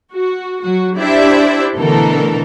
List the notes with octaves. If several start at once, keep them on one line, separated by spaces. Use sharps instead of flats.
F#4
F#3 F#4
D4 E4 G4 C5 D5 E5
B2 D3 E3 A3 A4 A#4